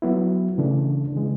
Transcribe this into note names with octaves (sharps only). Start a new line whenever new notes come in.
F#3 B3 E4
C#3 E3 A3 D4
C#3 E3 G#3